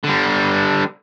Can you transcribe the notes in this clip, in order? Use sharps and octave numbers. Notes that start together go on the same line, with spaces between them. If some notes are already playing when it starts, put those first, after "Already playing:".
D3 G3